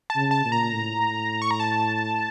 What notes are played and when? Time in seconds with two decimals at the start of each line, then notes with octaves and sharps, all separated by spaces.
0.10 A5
0.16 C#3
0.31 A5
0.45 A#2
0.52 A#5
0.74 A2
1.42 C#6
1.51 A#5
1.60 A5